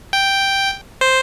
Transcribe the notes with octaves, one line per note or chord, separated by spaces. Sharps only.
G5
C5